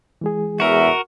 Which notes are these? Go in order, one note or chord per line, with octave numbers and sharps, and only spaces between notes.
E3 G#3 G#4
E2 F#4 A#4 E5